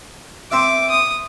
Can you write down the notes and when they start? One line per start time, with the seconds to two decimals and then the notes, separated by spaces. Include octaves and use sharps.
0.52 C4 E5 D6
0.90 D#6